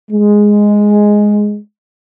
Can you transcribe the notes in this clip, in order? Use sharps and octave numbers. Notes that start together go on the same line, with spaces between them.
G#3